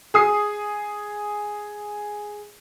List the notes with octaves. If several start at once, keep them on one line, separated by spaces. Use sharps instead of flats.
G#4 D#6 C7